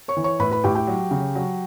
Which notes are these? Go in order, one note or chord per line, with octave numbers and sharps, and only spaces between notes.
C#5 C#6
E3
C#5 C#6
A2 B4 B5
B4 B5
A2 G4 G5
G4 G5
F#3
C#3
F#3